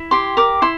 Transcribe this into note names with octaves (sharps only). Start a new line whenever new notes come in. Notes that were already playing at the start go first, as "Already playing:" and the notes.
Already playing: E4
G4 C6
A#4 D6
E4 C6